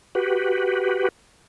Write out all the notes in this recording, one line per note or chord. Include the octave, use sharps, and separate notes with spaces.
F#4 G4 B4